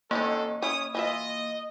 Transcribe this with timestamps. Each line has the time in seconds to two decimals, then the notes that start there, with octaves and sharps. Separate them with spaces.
0.11 E3 A#3 C4 C#4 D#4 F#4 A4
0.62 C#4 E4 C#5 D#6
0.95 E3 F4 D#5 E5